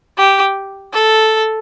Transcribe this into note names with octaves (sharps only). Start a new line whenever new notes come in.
G4
A4